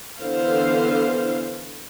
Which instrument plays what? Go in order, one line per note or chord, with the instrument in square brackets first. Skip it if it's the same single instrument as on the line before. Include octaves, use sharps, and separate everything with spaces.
[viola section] D3 E3 B3 C5 F5